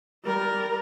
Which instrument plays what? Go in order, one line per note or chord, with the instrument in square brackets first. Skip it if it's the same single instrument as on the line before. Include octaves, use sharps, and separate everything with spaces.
[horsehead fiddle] G3 A#4